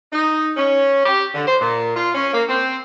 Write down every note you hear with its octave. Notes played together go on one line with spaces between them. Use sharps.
D#4
C#4
G4
D3
C5
A#2
F4
C#4
A#3
C4